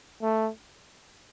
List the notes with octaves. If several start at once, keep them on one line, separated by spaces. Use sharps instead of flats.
A3